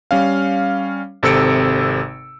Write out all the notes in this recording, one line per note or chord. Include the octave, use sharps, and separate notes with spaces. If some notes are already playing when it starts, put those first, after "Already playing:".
G3 C#4 F5
G#1 C3 A4 E6 C#7 D7